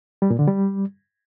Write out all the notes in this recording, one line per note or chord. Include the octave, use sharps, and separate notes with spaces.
G3
A#2
D3
G3